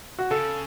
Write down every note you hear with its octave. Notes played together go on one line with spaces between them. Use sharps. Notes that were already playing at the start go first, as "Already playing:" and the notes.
F#4
C#3 A4